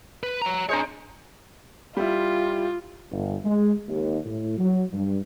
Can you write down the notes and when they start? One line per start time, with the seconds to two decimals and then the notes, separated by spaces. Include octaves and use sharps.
0.23 B4
0.42 C#5 A#5
0.69 G#3 D4 C5 C#5 A#5
1.97 G3 E4 F4
3.11 G1
3.45 G#3
3.88 D#2
4.25 A2
4.57 F#3
4.93 G2